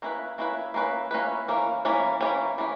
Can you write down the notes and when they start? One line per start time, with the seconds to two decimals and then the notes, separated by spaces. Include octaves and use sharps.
0.02 A#3 C#4 E4 B4
0.38 A#3 C#4 E4 B4
0.74 A#3 C#4 E4 B4
1.11 A#3 C#4 E4 B4
1.48 E3 A#3 C#4
1.85 E3 A#3 C#4
2.21 E3 A#3 C#4
2.58 E3 A#3 C#4